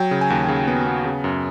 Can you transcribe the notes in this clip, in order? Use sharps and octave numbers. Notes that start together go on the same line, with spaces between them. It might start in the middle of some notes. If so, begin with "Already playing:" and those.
Already playing: F#3 G5
C#3
G#5
D#2
C#3
B3
B3
C#3
F#2